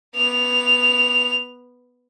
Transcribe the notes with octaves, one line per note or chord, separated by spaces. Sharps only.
B3 F7